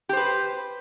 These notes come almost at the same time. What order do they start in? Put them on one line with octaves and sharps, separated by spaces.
G4 C5 B4